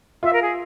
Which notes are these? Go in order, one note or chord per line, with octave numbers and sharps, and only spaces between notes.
F4 E5
A#4
G#4